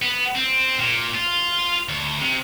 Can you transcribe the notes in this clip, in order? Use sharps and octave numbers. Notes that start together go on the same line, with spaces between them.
B3
C4
A#2
F4
D2
C3